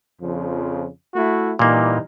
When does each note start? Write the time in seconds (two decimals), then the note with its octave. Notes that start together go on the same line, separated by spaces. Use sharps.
0.21 F2 C#3 F3
1.15 A3 E4 F#4
1.59 A#2 E3 G3 A#3 D#4